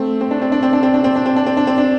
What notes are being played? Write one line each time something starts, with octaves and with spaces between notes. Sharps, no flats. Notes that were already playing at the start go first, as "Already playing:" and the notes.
Already playing: A3 C4
C4
D4
C4
D4
C4
D4
C4
D4
C4
D4
C4
D4
C4
D4
C4
D4